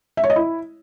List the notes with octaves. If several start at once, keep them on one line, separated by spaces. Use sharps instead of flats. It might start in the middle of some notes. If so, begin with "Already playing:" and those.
E5
C#5
D#5
E4